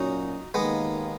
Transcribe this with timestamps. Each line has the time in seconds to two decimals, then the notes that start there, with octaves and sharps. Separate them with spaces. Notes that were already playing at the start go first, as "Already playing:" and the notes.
Already playing: A#2 F#3 C#4 D#4 F#4
0.54 D#2 D#3 G#3 A#3 B3